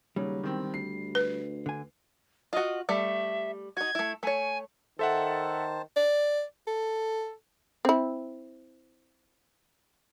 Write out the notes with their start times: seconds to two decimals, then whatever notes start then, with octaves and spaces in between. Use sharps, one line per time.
0.16 D#2 C#3 F#3 G3
0.43 E1 D#3 C4
0.74 D2 C7
1.15 B4
1.66 D3 G#5
2.53 F4 F#4 D#5
2.89 G3 A3 E5
3.77 D#4 F#4 G#6
3.95 A3 E4
4.23 A3 C#5 G#5
4.99 D#3 A4 C5 E5 F#5 A5
5.96 D5
6.67 A4
7.85 C4 E4